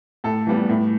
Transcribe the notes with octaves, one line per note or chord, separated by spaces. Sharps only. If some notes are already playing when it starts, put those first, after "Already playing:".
A2 A4
E3 G3 B3
A2